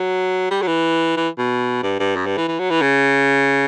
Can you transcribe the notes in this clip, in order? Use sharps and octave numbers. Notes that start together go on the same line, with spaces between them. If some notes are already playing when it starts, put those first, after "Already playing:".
Already playing: F#3
G3
F#3
E3
E3
B2
G2
G2
F#2
G2
E3
E3
F#3
E3
C#3